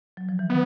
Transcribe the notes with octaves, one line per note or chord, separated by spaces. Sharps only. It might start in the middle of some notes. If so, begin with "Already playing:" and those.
F#3
F3
E3
D#3 B3